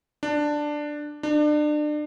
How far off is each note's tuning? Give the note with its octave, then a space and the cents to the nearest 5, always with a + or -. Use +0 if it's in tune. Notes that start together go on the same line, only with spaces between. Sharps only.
D4 +10
D4 +35